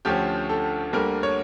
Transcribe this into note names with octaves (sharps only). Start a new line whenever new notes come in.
D2 D3 F3 A3 C#4 G4
A4
D2 D3 G3 A#3 A#4
C#5